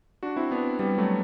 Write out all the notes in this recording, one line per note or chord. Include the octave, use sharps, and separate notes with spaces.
D4 F#4
C4 E4
B3 D4
G3 B3
F#3 A3